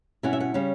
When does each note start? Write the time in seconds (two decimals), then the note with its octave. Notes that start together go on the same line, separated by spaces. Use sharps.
0.23 B2 G3 C#4 E4 F#5
0.33 E5
0.40 F#5
0.54 C#3 G3 C#4